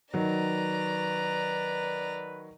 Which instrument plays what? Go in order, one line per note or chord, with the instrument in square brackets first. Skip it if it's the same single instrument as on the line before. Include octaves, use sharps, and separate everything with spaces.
[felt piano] D#3 F#3 [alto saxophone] B4 [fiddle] D5 A#5